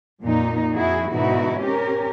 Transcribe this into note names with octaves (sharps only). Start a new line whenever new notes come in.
F2 A#2 D#4
F2 E4 F#4 G#4
G#2 B2 D3 D#4 E4 F#4
C4 C#4 G4 A#4